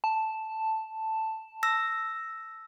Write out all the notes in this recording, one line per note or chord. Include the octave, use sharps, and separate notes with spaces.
A5
E6 A#6